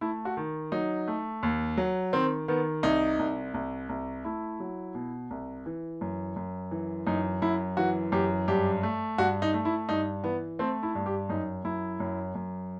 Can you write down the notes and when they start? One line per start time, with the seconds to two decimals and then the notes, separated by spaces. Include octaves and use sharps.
0.01 A3 E4
0.25 F#4
0.37 D#3
0.72 F#3 D#4
1.07 A3
1.43 D#2
1.77 F#3
2.13 D#3 C4
2.48 D#3 B3
2.83 C2 D#4
3.19 C2
3.54 C2
3.89 C2
4.24 A3 E4
4.60 F#3
4.95 B2
5.30 C2
5.66 E3
6.01 F#2
6.36 F#2
6.71 E3
7.06 F#2 D#4
7.42 F#2 E4
7.77 E3 F#4
8.12 F#2 G4
8.48 G2 G4
8.83 A3
9.18 G2 F#4
9.42 D#4
9.54 A3
9.65 E4
9.89 G2 D#4
10.23 E3 B3
10.59 A3 C4
10.83 E4
10.95 G2
11.06 G4
11.29 F#2 D#4
11.64 F#2 E4
12.00 F#2
12.35 F#2